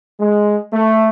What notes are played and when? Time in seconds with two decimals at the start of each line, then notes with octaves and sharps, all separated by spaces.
0.20 G#3
0.72 A3